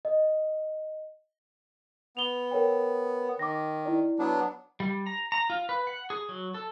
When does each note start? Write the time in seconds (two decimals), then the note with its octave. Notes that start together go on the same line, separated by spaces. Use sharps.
0.05 D#5
2.17 B3 F7 G7
2.51 A#4 C#5 G5
3.39 D#3 D6 A#6
3.86 E4 D5
4.19 F#3 B3 D4
4.80 G3
5.07 A#5
5.32 A#5
5.50 F4
5.69 B4
5.87 F#5
6.10 G#4
6.29 F#3
6.54 A4